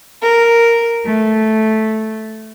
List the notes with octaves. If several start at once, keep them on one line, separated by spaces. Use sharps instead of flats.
A#4
A3